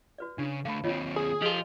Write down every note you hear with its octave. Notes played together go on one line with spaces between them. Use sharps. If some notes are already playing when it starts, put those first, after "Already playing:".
F#4 B4 D5
C#3 D4
D3 A3 F5 A5 B5
D#2 C4 F4 C#5 D#5
G#4
F3 F4 G4 A4 D#5 G#5